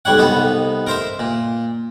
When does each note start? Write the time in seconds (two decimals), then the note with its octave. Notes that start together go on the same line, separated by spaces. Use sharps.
0.05 B1 G3 C#5 F#5
0.18 C2 B3 D#4 A4
0.87 A#4 C5 E5
1.19 A#2